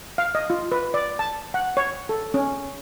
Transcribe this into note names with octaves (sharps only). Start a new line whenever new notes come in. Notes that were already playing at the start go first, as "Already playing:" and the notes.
F5
D#5
F4
B4
D5
A5
F#5
C#5
A4
C#4